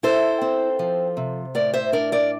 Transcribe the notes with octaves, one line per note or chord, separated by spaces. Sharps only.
E4 A4 C5
C4
F3
C3
A2 A#4 D5
C5 E5
D4 A#4 D5
A#4 D5